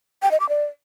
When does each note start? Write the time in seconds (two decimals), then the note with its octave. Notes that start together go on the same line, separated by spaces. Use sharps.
0.22 G5
0.31 D#5
0.40 D6
0.49 D5